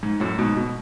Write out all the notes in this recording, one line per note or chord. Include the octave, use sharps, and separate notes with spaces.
G#2
F#2 A2
G#2 B2
B2